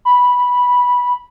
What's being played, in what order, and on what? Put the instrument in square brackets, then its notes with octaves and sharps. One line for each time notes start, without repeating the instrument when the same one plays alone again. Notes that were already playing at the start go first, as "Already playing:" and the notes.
[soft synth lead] B5